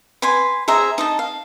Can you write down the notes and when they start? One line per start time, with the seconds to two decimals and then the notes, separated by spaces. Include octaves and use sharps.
0.22 B4 G#5 C6
0.68 G#4 C5 E5 A#5
0.98 D#4 D#5 A5
1.19 F5